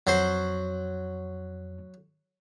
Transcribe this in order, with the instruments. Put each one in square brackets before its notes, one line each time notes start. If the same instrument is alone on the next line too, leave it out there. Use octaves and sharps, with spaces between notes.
[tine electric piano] F2 [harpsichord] F#3 C5